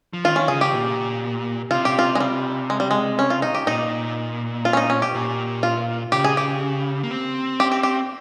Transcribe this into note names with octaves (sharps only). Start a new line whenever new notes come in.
F3
D#3 F4
C#4
C#3 G#4
G4
A#2
C3 F4
G4
F4
G#3
G3
G#3
G3
G#3
C#4
F4
D#4
G4
A#2 D#4
F4
C#4
D#4
C#4
G4
A#2
F4
C#3 G4
G#4
G4
A#3
C4
G4
G4
G4